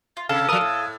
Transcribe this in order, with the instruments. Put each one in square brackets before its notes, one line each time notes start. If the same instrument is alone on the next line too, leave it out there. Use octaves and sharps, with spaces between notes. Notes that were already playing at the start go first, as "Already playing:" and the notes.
[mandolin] F4
[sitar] C3 [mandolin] A4 [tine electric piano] F5
[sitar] F3 A#4 [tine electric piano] F5 D#6
[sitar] A2